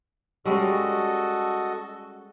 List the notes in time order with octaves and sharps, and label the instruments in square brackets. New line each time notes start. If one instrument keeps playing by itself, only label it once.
[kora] G3 G#3 C#4 [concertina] F#4 A4 D#5